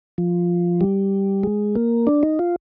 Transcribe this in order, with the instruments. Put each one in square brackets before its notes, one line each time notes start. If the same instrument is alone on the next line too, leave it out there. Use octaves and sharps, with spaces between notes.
[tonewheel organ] F3
G3
G#3
A#3
D4
D#4
F4